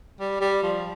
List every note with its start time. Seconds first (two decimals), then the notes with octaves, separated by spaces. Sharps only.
0.20 G3
0.41 G3
0.63 F3